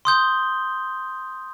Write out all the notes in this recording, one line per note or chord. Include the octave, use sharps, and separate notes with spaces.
C6 D#6 G6 G7